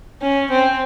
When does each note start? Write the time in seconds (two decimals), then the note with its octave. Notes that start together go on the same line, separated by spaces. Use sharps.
0.21 C#4
0.50 C4